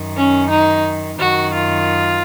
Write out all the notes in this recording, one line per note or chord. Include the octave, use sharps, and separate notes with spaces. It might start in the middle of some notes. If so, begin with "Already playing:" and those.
Already playing: F#2 D#3
C#4
D#4
F#2 D#3 F#4
F4